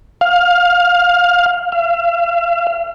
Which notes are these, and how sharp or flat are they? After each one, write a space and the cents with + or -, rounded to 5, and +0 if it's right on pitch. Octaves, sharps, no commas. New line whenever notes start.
F5 +20
F5 -40